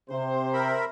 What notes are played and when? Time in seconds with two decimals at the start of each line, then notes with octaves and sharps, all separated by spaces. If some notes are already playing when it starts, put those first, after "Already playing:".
0.10 C3 C5
0.54 A#4 E5 B5